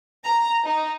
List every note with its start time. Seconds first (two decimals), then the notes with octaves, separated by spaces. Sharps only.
0.24 A#5
0.66 D#4